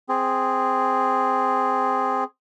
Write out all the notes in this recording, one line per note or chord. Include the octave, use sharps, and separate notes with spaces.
C4 G#4